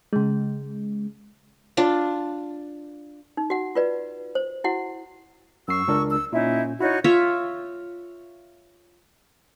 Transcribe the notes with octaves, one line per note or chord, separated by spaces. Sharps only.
C#3 G#3
D4 F4
D#4
F#4 F#5
F4 B4 D5
C5
E4 F#4 F#5
F#2 C#6 E6 C7
C#2 D4 A#4
E6
A#2 C#4 D#4 E4
D#4 E4 F#4 C#5
F4 C#5 E5